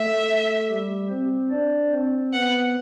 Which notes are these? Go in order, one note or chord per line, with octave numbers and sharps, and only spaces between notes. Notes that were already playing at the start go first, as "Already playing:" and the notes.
Already playing: A3 A4 E5
G3 G4
C4 C5
D4 D5
C4 C5
B3 B4 F#5